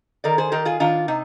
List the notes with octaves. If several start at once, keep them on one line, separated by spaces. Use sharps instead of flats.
D#3 A#4 D5
G#4 C5
D#3 G4 A#4
F4 G#4
D#3 D4 F4
C3 D#4